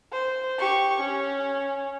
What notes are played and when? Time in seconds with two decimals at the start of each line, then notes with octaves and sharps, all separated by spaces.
0.12 C5
0.59 G4 C#6
1.01 C#4